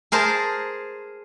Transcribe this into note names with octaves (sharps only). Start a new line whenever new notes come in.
G#4 A#4 C5 A5